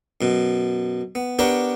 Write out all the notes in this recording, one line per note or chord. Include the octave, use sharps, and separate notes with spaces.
F#2 B2
B3
B3 D4 G4 A#4 B4 C#5